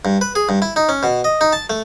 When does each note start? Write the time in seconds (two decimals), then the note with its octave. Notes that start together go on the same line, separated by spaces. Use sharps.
0.05 G2
0.21 B4
0.35 G#4
0.49 G2
0.62 E4
0.76 D#4
0.89 C#4
1.03 B2
1.24 D#5
1.41 D#4
1.53 A5
1.70 A3